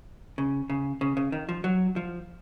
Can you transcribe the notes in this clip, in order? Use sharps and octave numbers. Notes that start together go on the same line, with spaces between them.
C#3
C#3
C#3
C#3
D#3
F3
F#3
F3